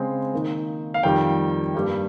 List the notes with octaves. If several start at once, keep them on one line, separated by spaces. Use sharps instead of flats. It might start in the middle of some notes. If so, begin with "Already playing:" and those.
Already playing: C#3 G#3 C4
D#3 A#3 D#4
F5
F2 D#3 G3 G5
G2 G3 A#3